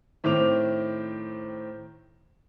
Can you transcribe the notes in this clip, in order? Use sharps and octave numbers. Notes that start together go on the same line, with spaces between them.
A2 D#3 C4 D6 F7